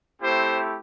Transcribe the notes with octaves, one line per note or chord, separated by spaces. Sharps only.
A3 C4 E4 G4 C5